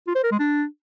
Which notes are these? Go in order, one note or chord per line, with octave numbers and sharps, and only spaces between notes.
F4
C5
A#4
G#3
D4